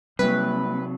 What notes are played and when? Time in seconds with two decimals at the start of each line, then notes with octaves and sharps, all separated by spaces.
0.19 C3 F#3 G3 A#3 B4